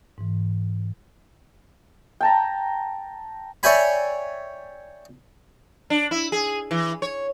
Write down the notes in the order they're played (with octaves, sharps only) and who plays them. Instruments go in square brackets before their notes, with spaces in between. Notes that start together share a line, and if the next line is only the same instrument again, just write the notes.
[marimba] G#2 E3
[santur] G5 A5 A#5
[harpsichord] C#5 D5 E5 G5 G#5 B5
[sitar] D4
E4
G#4
E3
C#5